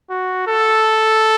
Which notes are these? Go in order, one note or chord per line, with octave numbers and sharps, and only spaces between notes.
F#4
A4